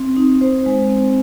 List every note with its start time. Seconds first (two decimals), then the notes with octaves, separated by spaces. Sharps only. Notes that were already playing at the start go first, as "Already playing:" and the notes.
Already playing: C4
0.17 D#4
0.41 C5
0.66 G#3
0.90 C4